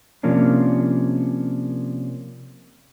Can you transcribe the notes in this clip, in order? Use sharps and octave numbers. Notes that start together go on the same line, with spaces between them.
C3 F3 A#3 C#4 D4